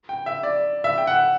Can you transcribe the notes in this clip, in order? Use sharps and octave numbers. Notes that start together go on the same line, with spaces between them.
G5
E5
D5
E5
G5
F#5